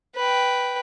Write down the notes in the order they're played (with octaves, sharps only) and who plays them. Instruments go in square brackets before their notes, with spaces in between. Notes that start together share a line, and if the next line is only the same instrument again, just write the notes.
[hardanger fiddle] B4 G5